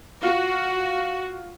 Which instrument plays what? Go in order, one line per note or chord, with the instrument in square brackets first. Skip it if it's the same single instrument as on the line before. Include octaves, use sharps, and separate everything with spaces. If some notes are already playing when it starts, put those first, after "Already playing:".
[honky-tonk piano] F4 [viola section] F#4